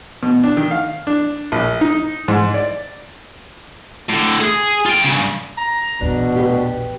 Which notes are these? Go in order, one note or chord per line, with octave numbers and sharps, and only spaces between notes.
B2
D4
D#3
F5
D4
A#1
D#4
G#2
D5
A2 D3
G#4
F4 G5
G2 C#3
A#5
A#1 E2 B2 D4
G4 B4